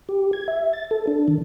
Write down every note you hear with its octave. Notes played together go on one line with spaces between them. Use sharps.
G4
G#6
E5
A6
A4
D4
D#3